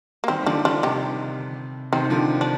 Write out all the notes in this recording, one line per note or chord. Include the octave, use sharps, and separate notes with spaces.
A#3
D#3 G3 C4
G3
D3 F3 A#3 D4
D3 D4 F4
C3 D#4 G4
C3 D#3 C4 D#4
D3 F3
D4